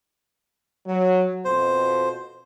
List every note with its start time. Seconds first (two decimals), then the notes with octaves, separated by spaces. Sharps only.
0.85 F#3
1.45 F2 B2 C5